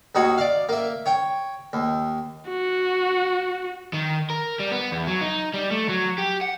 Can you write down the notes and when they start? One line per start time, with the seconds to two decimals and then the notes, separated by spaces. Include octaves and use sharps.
0.15 D#2 D#4 F#4 C#5
0.38 D5 F5
0.69 A#3 E5
1.06 C#5 G5
1.73 D#2
2.49 F#4
3.93 D#3
4.30 A#4
4.60 G3
4.72 B3
4.92 E2
5.07 F#3
5.21 D#4
5.54 G3
5.71 A3
5.89 F#3
6.18 G4
6.41 F#5